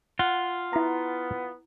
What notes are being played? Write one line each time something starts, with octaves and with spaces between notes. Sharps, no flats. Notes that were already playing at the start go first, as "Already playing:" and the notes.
F4 F#5
B3 E4 A#5